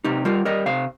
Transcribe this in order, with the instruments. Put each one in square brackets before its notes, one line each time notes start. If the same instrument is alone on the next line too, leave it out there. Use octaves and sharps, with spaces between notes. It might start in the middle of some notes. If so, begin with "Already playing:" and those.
[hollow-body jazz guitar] C3 D#4 G4
G3 F4 A#4
G3 A#4 D#5
C3 C5 F5